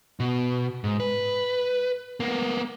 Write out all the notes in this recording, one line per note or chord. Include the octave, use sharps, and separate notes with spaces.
B2
G#2
B4
A#3 B3